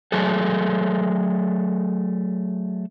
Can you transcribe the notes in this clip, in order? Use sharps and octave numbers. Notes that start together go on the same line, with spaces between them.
F#3 A3 G#4 A4